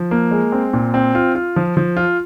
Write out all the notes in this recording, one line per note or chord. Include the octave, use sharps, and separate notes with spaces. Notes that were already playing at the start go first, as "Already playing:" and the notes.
Already playing: F3
A#3
G#3
C4
A#2
C4
F4
F4
F3
F3
F4